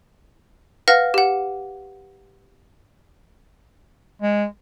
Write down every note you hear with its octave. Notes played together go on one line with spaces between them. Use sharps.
B4 F5 F#5 F6 A#6
G4 F#5
G#3